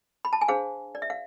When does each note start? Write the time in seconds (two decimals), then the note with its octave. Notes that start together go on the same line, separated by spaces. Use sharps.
0.25 B5
0.33 A5
0.41 G#5
0.48 D4 G#4 C5 F5
0.95 D5
1.02 E5
1.10 F5